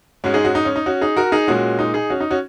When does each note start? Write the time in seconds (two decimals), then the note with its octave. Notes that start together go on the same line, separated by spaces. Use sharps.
0.24 G#2 G#3 C#4 F#4
0.34 D#4 G#4
0.45 C#4 F#4
0.55 D#4
0.65 C#4
0.76 D#4
0.86 C#4 F#4
1.01 D#4 G#4
1.17 F#4 A#4
1.32 D#4 G#4
1.48 A#2 G#3 C#4 F#4
1.79 D#4
1.94 D#4 G#4
2.10 C#4 F#4
2.21 D#4
2.31 C#4 F#4